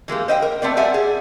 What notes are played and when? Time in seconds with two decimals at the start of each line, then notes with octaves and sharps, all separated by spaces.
0.08 E3 G#3 A#3 G4
0.28 C5 D#5 E5 G5
0.42 A#4
0.62 A3 B3 C4 D5
0.77 G3 D5 E5 F#5 G#5
0.94 G#4